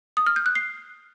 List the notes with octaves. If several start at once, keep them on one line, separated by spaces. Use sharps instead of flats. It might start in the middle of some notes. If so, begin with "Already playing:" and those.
D#6
F6
G6
F#6
C7